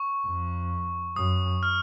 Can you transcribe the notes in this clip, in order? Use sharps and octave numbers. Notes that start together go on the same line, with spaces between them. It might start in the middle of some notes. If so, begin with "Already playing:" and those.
Already playing: C#6
F2
F#2 D#6
F6